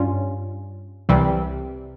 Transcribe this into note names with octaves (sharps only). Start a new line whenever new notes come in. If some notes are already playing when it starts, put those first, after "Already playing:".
Already playing: G2 G3 C#4 F4
C2 C3 E3 G3 C4